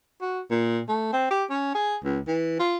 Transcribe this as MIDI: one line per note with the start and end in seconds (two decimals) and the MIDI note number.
0.21 0.41 66
0.51 0.80 46
0.89 1.11 57
1.13 1.30 60
1.30 1.44 67
1.50 1.74 61
1.75 1.96 68
2.04 2.20 37
2.27 2.58 52
2.59 2.78 65